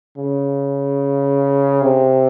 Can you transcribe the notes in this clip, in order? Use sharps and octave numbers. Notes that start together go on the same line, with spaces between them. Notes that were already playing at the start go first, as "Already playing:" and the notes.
C#3
C3